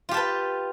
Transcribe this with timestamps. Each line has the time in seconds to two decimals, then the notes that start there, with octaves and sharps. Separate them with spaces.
0.09 F4
0.11 G4
0.14 A5
0.17 B4